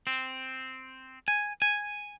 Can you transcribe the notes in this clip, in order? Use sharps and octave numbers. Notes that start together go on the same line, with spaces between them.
C4
G#5
G#5